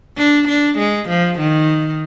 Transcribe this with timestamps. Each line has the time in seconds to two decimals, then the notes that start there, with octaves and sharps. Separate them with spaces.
0.18 D4
0.48 D4
0.78 G#3
1.09 F3
1.39 D#3